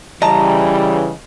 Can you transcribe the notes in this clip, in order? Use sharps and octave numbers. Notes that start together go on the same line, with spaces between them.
C#3 E3 G3 D#5 A5 A#5